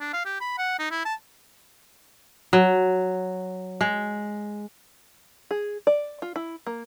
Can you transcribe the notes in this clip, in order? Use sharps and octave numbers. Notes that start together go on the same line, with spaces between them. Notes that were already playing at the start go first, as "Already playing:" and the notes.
D4
F5
G4
B5
F#5
D#4
E4
A5
F#3
G#3
G#4
D5
F4
E4
A#3